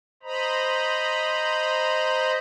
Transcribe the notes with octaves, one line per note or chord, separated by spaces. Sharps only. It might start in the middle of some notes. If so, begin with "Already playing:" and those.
C5 D#5 A#5 B5